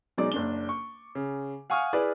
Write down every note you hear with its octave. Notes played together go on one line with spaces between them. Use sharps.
B2 F#3 G#3 D#4 D5 D6
F#1 D4 G7
C#6
C#3
F5 F#5 G#5 C#6 D#6 F6
E4 G#4 B4 D5